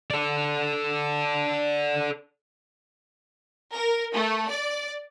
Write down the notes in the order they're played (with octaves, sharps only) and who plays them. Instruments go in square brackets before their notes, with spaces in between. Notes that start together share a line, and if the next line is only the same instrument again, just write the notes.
[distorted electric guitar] A4 D5
[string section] A#4
A3
D5